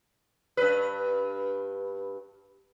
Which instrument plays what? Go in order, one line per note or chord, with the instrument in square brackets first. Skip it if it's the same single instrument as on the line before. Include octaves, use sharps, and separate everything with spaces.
[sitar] G2 B4